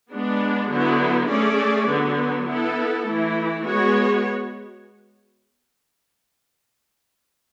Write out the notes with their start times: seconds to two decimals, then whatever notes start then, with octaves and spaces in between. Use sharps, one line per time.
0.12 G#3 B3 D4
0.72 D3 F#3 B3 E4
1.31 A3 C#4 G#4 D5
1.89 D3 F#3 B3
2.48 B3 E4 A4
3.07 E3 A3 E4
3.66 G#3 B3 F#4 C#5